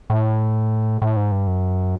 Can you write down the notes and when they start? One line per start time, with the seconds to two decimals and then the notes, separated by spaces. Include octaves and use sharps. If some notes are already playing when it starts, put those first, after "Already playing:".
0.10 A2
1.02 A2
1.17 G#2
1.32 G2
1.47 F#2